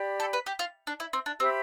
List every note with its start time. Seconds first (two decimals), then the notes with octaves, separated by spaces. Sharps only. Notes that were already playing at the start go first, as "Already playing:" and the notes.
Already playing: G4 D5 G5 B5
0.20 A4
0.33 B4
0.46 G4
0.59 F4
0.87 D4
1.00 E4
1.13 C4
1.26 D4
1.40 C4 G4 C5 E5 B5